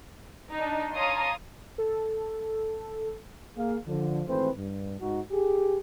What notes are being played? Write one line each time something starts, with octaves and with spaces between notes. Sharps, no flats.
D4 D#4
C#5 F5 A5 A#5 C6 D#6
A4
A#3 G#4 F5
D3 F3
G#1 E3 A3 C4 B4 C5
G2
G#2 D#4 F#4
G4 G#4